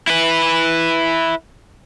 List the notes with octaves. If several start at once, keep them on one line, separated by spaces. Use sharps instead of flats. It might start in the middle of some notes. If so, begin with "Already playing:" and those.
E4 B4